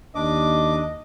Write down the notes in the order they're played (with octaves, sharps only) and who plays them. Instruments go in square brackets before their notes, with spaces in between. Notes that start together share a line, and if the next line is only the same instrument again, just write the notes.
[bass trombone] D#2 [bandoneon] D4 D6 [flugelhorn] D#5